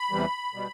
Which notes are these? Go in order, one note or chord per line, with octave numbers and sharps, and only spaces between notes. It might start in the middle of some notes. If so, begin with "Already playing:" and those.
Already playing: B5
E2 C3 E3 G3
B2 G3